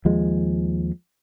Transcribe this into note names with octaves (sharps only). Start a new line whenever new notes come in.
D#2 F3 G#3